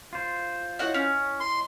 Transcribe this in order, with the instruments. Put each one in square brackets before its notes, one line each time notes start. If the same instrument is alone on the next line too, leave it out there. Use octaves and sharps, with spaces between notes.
[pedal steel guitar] F4 C5
[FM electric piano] E4 C#5 D#5 [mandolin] F#4 F#5
[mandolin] C#4
[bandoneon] C6